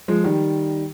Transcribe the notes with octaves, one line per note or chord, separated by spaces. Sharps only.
F3 G#3
D#3 G3